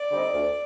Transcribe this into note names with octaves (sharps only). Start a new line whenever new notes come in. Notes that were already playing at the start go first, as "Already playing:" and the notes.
Already playing: D5
D3 G3 C4 D#4
D2